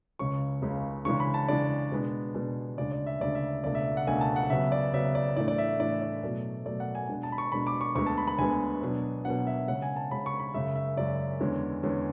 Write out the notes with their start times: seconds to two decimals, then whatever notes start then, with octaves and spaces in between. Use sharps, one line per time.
0.19 C#2 C#3 G#3 C#4 C#6
0.62 C#2 C#3 G#3 C#4
1.05 C#3 E3 G#3 D4 C#6
1.20 B5
1.34 A5
1.48 C#3 E3 G#3 D4 D5
1.91 B2 G#3 B3 D4
2.35 B2 G#3 B3 D4
2.78 D2 C#3 G#3 D4 D5
2.92 D5
3.06 E5
3.21 D2 C#3 G#3 D4 D5
3.35 E5
3.64 C#2 B2 A3 D4 D5
3.75 E5
3.97 F#5
4.07 C#2 B2 A3 D4 G#5
4.21 A5
4.36 F#5
4.50 C#3 F#3 B3 E5
4.72 D5
4.93 C#3 F#3 B3 E5
5.15 D5
5.36 A2 E3 A3 D4 D5
5.48 D5
5.58 E5
5.79 A2 E3 A3 D4 D5
6.02 D5
6.23 B2 F#3 A3
6.65 B2 F#3 A3 D5
6.80 F#5
6.95 G#5
7.09 B2 G#3 D4
7.23 A5
7.32 B5
7.38 C#6
7.52 B2 G#3 D4 B5
7.67 D6
7.81 C#6
7.95 D2 D3 G#3 B3 C#6
8.06 A5
8.17 B5
8.28 B5
8.38 D2 D3 G#3 B3 G#5
8.82 B2 F#3 B3 D4
9.25 B2 F#3 B3 D4 F#5
9.47 E5
9.68 C#3 G#3 C#4 F#5
9.82 G#5
9.96 A5
10.11 C#3 G#3 C#4 B5
10.26 C#6
10.39 B5
10.54 F#2 C#3 G#3 E5
10.75 E5
10.97 F#2 C#3 G#3 D5
11.40 E2 D3 G#3 C#4
11.83 E2 D3 G#3 C#4